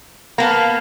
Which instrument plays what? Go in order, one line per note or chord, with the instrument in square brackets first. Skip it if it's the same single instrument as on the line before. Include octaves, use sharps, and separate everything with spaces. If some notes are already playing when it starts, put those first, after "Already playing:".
[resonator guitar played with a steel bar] A#3 B3 [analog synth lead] F5 [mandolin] A5 A#5